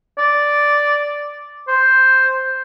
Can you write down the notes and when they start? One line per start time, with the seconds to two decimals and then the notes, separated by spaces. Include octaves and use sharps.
0.18 D5
1.68 C5